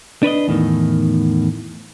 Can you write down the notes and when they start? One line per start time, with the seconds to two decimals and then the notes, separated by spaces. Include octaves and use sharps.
0.23 D4 B4 C#5 D#5
0.48 E2 A2 D#3